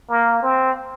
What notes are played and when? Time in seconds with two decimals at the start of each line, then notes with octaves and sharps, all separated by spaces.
0.09 A#3
0.42 C4